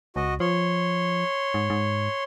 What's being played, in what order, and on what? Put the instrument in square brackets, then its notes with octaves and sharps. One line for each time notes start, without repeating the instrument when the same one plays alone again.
[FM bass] C#2 [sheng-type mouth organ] F#4 D#5
[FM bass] F3 [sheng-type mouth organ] C#5 C6
[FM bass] G#2
G#2